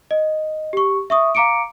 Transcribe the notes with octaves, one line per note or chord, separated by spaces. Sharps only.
D#5
G4 C#6
E5 C#6 D#6
F5 A#5 D6 C#7 D7